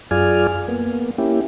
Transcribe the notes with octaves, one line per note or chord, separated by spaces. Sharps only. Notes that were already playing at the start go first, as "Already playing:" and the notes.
F#2 F4 G#4 D5 G#5 F6
A#3 B3
A#3 C#4 E4 G4